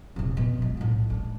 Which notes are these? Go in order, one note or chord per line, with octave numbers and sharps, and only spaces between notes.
E1 C3
B2
F3 G#3
B1 A2
G#3 D4